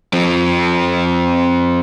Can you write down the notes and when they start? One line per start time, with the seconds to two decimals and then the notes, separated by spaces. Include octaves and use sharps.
0.13 F3 C4